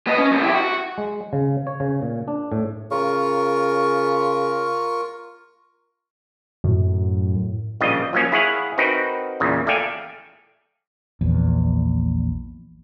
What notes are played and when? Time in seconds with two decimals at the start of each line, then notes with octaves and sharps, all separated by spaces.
0.07 B3 D#5
0.18 C#4
0.31 F#2 C3
0.42 E4 G4
0.55 F#4
0.98 G#3
1.33 C#3
1.67 C#5
1.80 C#3
2.02 A#2
2.28 D4
2.52 A2
2.91 C#3 F4 A#4 C#6
6.64 F#2 A2
7.80 A#1 C#3 G3 F4 D#5
8.13 F3 F#3 A#3 C#4
8.32 E4 G#4 C#5 F5 F#5
8.78 C4 D#4 F#4 A#4 B4
9.40 E2 A#2 C#3
9.66 A3 A4 D5 F5 G5 G#5
11.21 A#1 E2